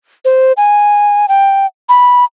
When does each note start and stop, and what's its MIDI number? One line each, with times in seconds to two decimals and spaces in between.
0.25 0.53 72
0.57 1.26 80
1.29 1.66 79
1.89 2.25 83